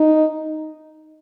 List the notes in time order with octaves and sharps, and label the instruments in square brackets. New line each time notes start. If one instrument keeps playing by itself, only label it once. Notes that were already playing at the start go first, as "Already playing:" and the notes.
Already playing: [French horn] D#4